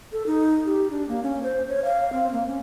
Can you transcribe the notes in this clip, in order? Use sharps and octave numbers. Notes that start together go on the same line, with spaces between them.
A4
D#4
G4
D4
A#3
C#4
C5
C#5
F5
C4
A#3
C#4